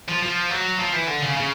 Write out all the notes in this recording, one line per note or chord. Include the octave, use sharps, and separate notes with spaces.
F3
F3
F#3
F3
E3
D3
C#3
C#3